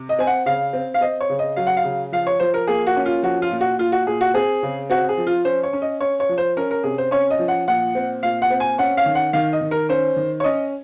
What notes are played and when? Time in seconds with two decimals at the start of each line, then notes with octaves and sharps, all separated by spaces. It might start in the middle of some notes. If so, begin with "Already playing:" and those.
Already playing: C3
0.09 D#5
0.19 C4 G#5
0.27 F#5
0.46 C#3 F5
0.73 C4
0.94 F5
1.01 C4 D#5
1.21 C#5
1.29 C#3
1.39 D#5
1.56 F#3 F5
1.67 F#5
1.77 F5
1.84 C#3
2.12 F3 F5
2.27 C#5
2.40 F3 C5
2.54 A#4
2.67 A#3 G#4
2.87 F#4
2.96 C#4
3.06 F4
3.23 F3 F#4
3.42 F4
3.51 A#2
3.61 F#4
3.78 A#2 F4
3.92 F#4
4.07 A#2 G#4
4.21 F#4
4.34 C4 G#4
4.63 C#3
4.90 C4 F#4
5.09 G#4
5.17 F3
5.27 F4
5.45 C#4 C5
5.63 C#5
5.73 C#4
5.82 D#5
6.00 C#4 C#5
6.20 C#5
6.29 F3
6.38 C5
6.57 C#4 A#4
6.71 A#4
6.83 C3 G#4
6.98 C5
7.11 C#4 C#5
7.30 D#5
7.39 F3
7.48 F#5
7.67 A#2 F#5
7.95 C4
8.23 A#2 F5
8.42 F#5
8.50 C4
8.60 G#5
8.78 C#4 F#5
8.97 F5
9.06 D#3
9.15 F#5
9.33 D#3 F5
9.53 D#5
9.61 D#3
9.71 A#4
9.89 C#4 C5
10.16 D#3
10.40 C#5
10.44 C#4 D#5